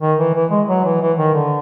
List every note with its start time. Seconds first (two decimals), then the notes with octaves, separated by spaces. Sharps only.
0.02 D#3
0.18 E3
0.34 E3
0.51 G#3
0.68 F#3
0.85 E3
1.01 E3
1.18 D#3
1.34 D3